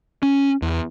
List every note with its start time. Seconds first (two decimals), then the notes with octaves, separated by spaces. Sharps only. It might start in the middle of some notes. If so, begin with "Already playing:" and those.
0.23 C#4
0.62 E2